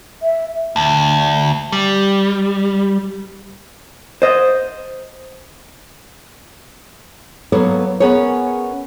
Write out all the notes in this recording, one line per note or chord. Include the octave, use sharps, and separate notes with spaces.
E5
D2
G3
C5 D#5
F#3 A#3 B3 A4 C#5
B3 C#4 G#4 A#4 C#5